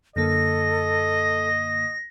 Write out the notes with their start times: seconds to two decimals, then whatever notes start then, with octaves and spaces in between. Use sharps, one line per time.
0.16 F#2 D3 A#3 A4 D#5 A#6